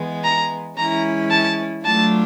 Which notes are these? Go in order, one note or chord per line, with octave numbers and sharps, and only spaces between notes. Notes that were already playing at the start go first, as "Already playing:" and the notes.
Already playing: E3 G#3 B3
A#5
E3 G#3 C#4 E4 A#5
A5
F#3 A3 D4 F4 A5